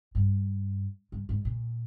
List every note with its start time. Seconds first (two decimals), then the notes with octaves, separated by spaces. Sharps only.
0.15 G2
1.12 G2
1.29 G#2
1.45 A#2